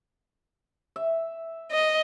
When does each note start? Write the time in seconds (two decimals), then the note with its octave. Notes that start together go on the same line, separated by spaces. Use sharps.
0.96 E5
1.71 D#5